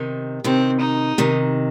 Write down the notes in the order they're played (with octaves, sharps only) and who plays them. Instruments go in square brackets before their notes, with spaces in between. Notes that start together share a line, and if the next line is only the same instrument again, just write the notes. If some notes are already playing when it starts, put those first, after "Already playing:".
Already playing: [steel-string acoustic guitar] C3 D#3
[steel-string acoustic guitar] C3 D#3 [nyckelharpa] C4
[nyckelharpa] D#4
[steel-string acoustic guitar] C3 D#3